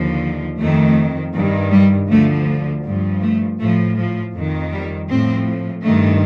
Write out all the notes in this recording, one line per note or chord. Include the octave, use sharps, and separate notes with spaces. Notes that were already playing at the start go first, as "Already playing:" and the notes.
Already playing: D#2 D3 F3
F2 D#3 A3
G2 D#3
G3
D2 D3 F3 A3
G2 F3
A3
A2 F3 A3
F3
F2 D#3
G3
A2 F3 C4
G2 D#3 A3